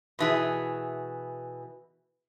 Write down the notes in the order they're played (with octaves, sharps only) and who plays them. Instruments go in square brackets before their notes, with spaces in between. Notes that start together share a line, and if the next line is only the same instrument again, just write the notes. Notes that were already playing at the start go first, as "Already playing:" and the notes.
[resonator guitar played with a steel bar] B2 E3 G#4